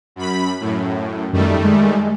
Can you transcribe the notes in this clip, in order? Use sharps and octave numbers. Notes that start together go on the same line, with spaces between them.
F#2 B5
F#2 A2
F#2 D#3 G3 A3
G#3